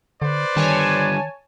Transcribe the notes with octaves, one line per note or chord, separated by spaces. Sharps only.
D3 B4 C5 D5
D3 D#3 G3 C#5 G#5 A5